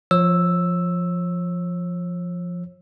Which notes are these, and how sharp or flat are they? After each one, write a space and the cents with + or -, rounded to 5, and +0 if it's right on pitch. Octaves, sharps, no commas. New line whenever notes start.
F3 +0 C#5 -35 E6 +0